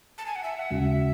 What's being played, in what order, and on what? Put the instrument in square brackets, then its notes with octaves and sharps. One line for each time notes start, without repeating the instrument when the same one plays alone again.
[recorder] A5
G#5
F#5
E5
F#5
[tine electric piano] D#2 C#3 G#3 C#4 F#4 [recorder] E5